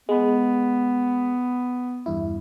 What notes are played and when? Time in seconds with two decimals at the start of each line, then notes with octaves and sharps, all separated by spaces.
0.09 G#3 B3
2.06 E2 G2 E4